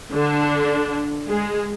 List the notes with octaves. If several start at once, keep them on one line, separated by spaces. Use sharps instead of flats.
D3 D4
G#3 G#4